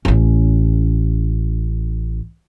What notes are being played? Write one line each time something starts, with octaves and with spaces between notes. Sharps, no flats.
A1 C#4